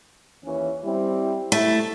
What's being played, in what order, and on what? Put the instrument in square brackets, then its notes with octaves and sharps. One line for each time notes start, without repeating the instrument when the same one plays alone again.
[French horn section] D#2 E3 C#4
G3 C4 E4
[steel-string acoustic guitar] A3 [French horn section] E4